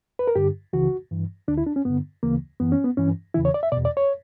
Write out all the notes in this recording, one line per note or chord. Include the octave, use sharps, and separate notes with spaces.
B4
A#4
G2 D3 G4
C#2 C#3 E3 F#4
G2 E3
D2 D3 D4
E4
D4
C#4
G2 D3 B3
D2 C#3 E3 A#3
F#2 E3 B3
C#4
B3
G2 E3 C#4
E2 C#3 E3 E4
C#5
D5
E5
E2 B2 D5
D5
C#5